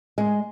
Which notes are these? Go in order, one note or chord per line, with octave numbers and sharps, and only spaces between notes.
G#3